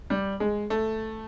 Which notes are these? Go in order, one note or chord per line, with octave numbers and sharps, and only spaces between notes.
G3
G#3
A3